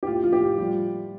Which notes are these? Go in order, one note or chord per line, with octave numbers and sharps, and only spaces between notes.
G4
A2 F4
F3 F4
G4
F3
G3 F4